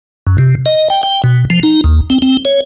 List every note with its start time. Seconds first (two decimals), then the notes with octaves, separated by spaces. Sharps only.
0.27 F#2
0.38 C3
0.66 D#5
0.90 G5
1.03 G5
1.24 B2
1.50 F3
1.63 D#4
1.84 D#2
2.10 C4
2.22 C4
2.45 C#5